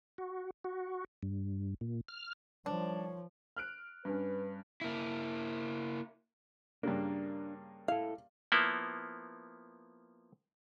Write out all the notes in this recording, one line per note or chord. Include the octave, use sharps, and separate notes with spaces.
F#4
F#4
G2
A#2
F6
D#3 F3 G3 D4 C5 C#5
F6 F#6 D7
G2 C#4 B4
A#3 E4
G2 C#3 A#3 D4
E4 A4 F5
F3 A#3 B3 E4